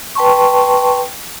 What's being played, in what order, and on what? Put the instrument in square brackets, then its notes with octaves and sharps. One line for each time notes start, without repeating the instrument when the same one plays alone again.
[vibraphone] B4 G5 A5 C6 C#6